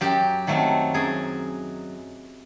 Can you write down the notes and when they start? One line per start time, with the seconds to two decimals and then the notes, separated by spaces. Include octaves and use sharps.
0.01 F#2 G4
0.47 D#3 F#3 A3 C4
0.94 F#2 G#4